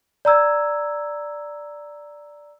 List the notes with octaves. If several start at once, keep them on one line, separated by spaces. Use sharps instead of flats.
D5 A#5 E6 G#6